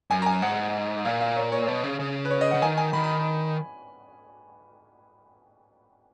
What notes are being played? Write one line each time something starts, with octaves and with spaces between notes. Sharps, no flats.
F#2 G#5
A#5
G#5
G#2 F#5
A#2 F5
F5
C#5
C#5
B2
C#3
C#3
B4
C#5
D#5
F#5
C#3
D#3 G#5
G#5
D#3 B5
B5